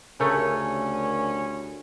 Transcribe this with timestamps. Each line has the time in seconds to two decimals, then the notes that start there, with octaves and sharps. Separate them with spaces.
0.20 D2 C#3 A3 C#4 G4 A#4